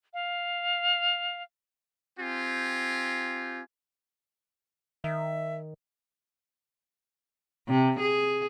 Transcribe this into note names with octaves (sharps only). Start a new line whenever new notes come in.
F5
C4 F4 G4 G#5
D#3 E5
C3
G#4